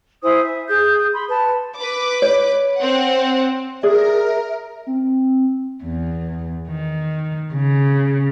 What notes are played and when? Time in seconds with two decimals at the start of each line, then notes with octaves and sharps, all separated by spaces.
0.24 E4 C5 G#5 D#6
0.43 E5
0.69 G#4 D#6 G6
1.14 B5 C6
1.29 B4 A5
1.77 B4 D6
2.22 C#5
2.77 C4 F#5
3.83 G#4 A#4 D5 E5
4.87 C4
5.83 E2
6.69 D#3
7.53 C#3